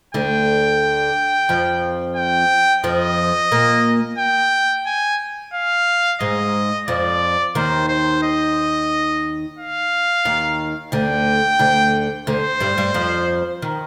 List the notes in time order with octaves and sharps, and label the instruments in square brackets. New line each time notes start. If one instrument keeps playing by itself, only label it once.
[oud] D2 D3 [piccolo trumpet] G5
[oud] F2 F3
[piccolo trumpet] G5
[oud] F2 F3 [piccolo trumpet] D#5
[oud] A#2 A#3
[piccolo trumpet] G5
G#5
F5
[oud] G#2 G#3 [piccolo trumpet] D#5
[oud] F2 F3 [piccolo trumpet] D5
[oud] D#2 D#3 [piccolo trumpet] C5
[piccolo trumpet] C5
D#5
F5
[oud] D#2 D#3
[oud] D2 D3 [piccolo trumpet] G5
[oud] D2 D3
[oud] D2 D3 [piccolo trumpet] C5
[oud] G2 G3
G2 G3
F2 F3
D#3